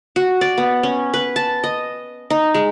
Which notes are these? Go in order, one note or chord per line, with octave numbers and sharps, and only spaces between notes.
F#4
D5
B3
C#4
B4
A5
D#5
D#4
G#3